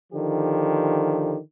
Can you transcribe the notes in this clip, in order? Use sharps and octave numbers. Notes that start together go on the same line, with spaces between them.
D3 D#3 F3 G4